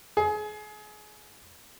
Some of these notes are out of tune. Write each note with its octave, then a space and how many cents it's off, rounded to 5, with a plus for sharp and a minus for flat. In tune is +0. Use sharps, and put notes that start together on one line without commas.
G#4 +30